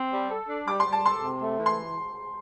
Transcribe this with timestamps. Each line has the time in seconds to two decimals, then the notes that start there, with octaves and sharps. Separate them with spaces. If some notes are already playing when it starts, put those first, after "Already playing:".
Already playing: C4
0.13 G3
0.31 A4
0.49 D4
0.67 G3 D6
0.80 C6
0.85 G3
0.93 A5
1.03 A4 C6
1.22 C3
1.41 A3
1.59 E3
1.66 C6